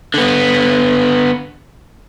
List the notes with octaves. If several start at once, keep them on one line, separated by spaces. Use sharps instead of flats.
D3 B3